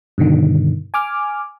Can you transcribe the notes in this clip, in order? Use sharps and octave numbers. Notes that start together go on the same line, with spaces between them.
G2 B2 D3 D#3
G#5 D6 F6